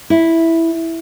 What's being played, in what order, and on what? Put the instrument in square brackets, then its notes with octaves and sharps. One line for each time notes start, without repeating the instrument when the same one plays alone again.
[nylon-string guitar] E4